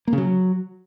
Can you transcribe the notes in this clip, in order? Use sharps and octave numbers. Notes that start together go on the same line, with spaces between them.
A#3
C#3
F#3